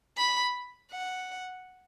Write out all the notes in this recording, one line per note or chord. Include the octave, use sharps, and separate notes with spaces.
B5
F#5